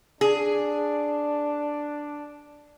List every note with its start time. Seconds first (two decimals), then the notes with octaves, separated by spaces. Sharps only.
0.21 D4 G#4